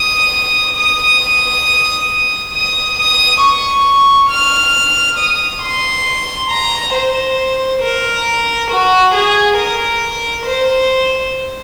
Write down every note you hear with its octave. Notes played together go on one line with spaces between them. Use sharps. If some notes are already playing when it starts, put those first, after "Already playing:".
Already playing: D#6
D#6
D#6
D#6
C#6
F6
D#6
C6
A#5
C5
A#4
F#4
G#4
A#4
C5